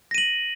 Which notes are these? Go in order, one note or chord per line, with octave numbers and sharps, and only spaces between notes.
A#6 D#7 F#7